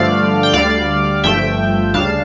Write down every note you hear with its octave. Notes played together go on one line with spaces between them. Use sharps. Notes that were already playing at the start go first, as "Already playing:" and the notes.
Already playing: G2 D3 F3 A3 D5 F5
G5
D2 D3 G3 D5 F5
G1 G2 F3 A3 E5 G5
D2 C#3 G3 D4 F5 A5